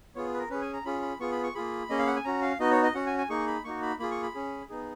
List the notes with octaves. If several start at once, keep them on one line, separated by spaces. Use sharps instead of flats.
B3 F4 G#4 C#5
B4
A#4
C#4 G#4 B4
G#5
A#5
C#4 F4 G#4 B5
B5
B3 F4 G#4 C#6
B5
C#6
A#3 F4 G#4 B5
A#3 C#4 G#4 D#5
F5
F#5
G#5
C#4 F#4 A#5
F5
B3 D#4 F#4 D#5
C#5
D#5
C#4 F#4 F#5
G#5
G#5
A#3 D#4 G#4 C#6
B5
A#3 D#4 F#4 C#6
B5
A#3 F4 G#4 B5
C#6
B5
C#4 G#4
B3 D#4 G#4